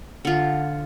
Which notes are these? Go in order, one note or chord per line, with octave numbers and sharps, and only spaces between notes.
D3 F4